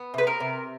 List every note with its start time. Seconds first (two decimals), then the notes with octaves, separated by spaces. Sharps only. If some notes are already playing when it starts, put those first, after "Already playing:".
Already playing: B3
0.14 C3 B4
0.27 A#4
0.40 C3